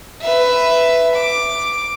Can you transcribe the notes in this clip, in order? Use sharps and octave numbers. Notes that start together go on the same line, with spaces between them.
B4 E5
D6